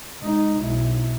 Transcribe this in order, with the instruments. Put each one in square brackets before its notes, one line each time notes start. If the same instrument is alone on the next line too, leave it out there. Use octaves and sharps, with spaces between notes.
[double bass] G#3 D#4
B1 E4